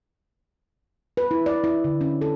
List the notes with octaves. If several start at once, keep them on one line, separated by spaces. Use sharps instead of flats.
B4
E4
D5
E4
D3
C#4
A4